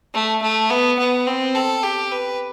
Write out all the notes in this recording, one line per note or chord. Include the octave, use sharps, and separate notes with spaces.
A3
A3
B3
B3
C4
A4
G4
B4